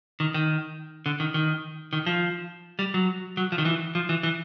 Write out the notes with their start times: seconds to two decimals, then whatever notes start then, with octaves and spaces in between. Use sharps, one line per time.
0.20 D#3
0.34 D#3
1.06 D3
1.20 D#3
1.34 D#3
1.93 D#3
2.06 F3
2.79 G3
2.94 F#3
3.37 F#3
3.52 F3
3.58 D#3
3.65 E3
3.95 F3
4.09 E3
4.23 E3